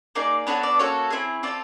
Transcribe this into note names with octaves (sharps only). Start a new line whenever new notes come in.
A#3 D#4 G#4 D5
B3 D4 F#4 A4 C#5
D5
A#3 C#4 F#4 A4 C#5
C4 E4 G#4
C4 F4 A4 D5